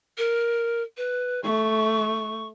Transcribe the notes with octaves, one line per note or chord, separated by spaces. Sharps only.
A#4
B4
A3 C#6